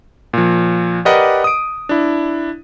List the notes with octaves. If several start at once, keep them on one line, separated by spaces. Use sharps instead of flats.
A#2 F3
G4 A#4 B4 D5 D#5 F#5
D#6 D7
D4 E4